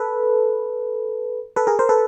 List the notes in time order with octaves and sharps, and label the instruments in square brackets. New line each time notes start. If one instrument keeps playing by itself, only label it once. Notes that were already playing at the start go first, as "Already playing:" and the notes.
Already playing: [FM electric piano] A4 B4
A4 B4
G#4 A#4
A#4 C5
A4 B4